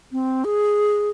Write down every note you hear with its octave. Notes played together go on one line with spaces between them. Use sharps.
C4
G#4